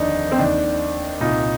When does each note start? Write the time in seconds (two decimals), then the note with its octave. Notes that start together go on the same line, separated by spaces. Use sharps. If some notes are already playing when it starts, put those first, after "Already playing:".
Already playing: F1 D#2 D3 D4 D#4
0.32 C4
0.38 D#2 D#3 D4
1.20 C2 A#2 D#4